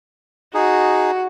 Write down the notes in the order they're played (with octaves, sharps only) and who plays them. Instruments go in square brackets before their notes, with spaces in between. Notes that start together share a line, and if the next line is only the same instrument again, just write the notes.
[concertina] D#4 G#4 [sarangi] F#4